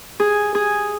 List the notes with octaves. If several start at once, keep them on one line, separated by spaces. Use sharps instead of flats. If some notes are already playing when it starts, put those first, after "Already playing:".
G#4
G#4